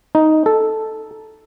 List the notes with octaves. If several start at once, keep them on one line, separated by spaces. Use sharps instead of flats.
D#4
A4